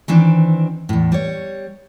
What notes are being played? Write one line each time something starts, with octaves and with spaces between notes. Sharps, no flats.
D#3 E3 C4 D4
E2 A2
G3 C#5